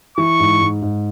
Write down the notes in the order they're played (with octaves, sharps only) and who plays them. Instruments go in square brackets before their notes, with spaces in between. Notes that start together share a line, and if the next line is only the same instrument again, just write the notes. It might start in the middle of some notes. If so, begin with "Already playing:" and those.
[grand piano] E3 [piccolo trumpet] C#6
[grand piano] G#2
G#2
G#2